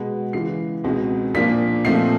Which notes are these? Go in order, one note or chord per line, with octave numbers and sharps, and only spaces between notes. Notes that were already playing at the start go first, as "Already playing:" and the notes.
Already playing: B2 G#3 B3
C#3 E3 G#3 C7
C#2 B2 G#3 C4 D#4
A#2 F3 A#3 D4 B6
A#2 F3 A3 C4 D#4 C7